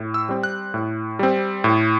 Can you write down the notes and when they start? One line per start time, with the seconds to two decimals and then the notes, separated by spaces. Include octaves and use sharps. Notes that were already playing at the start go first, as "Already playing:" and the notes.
Already playing: A2
0.14 E6
0.29 G3 C4
0.43 F#6
0.74 A2
1.19 G3 C4
1.64 A2